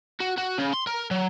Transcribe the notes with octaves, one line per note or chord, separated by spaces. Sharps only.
F#4
F#4
C#3
C6
A#4
F#3